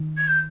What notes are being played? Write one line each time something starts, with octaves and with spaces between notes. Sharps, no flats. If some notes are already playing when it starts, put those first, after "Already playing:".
Already playing: D#3
G#6
G6